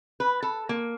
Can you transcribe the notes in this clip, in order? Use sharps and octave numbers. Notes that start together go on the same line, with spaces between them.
B4
A4
A#3